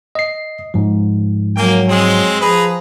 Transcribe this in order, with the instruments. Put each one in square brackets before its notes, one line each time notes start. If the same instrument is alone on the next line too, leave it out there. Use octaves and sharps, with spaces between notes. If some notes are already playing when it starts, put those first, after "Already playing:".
[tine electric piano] D#5 C7
G#2 F3
[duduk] F#3 [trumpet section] A#3 G5 G#5
[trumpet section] G#3 C4 G#4
[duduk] F3 [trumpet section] G#4 B4 A#5